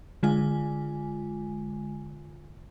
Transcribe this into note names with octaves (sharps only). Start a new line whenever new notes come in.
D3 G#3 F4 G#5